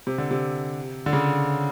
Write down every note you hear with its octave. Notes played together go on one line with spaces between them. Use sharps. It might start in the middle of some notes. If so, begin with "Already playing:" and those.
C3
D3
C3
D3
C#3